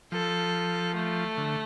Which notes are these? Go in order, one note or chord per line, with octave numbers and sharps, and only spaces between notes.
F3 A4
A3
D3